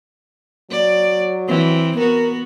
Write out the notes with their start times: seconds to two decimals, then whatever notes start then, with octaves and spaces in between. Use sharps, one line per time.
0.71 F#3 D5
1.48 E3 C4
1.97 B3 F#4 A#4